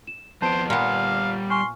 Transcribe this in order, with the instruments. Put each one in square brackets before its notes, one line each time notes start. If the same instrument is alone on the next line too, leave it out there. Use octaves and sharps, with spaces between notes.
[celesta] E7
[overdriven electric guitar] F2 B3 [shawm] C5 [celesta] A5 D7
[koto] A#2 B3 [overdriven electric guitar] G3 F#5 [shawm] F5
[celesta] G#5 C#6 F6 [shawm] C6